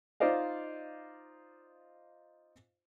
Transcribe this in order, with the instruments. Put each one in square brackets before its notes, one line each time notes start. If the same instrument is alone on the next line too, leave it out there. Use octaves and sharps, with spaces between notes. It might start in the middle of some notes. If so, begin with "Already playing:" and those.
[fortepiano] D#4 F4 C5 D5 D#5 F5